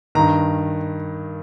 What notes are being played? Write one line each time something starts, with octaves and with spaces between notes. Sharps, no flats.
G2 D#3 A#5